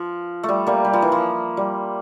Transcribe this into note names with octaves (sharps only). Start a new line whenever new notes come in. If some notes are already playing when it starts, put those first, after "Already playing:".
Already playing: F3
A3
G3
G3 A#3
G3
F3
E3
F3
G3